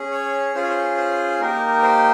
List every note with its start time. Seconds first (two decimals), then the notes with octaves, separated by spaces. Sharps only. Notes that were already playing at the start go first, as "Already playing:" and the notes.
Already playing: C#4 G#4
0.12 C#5
0.54 C#4 F4 G#4 C5
0.62 C#5
0.70 C5
0.97 C5
1.40 A#3 D#4 G4 A#4
1.83 C5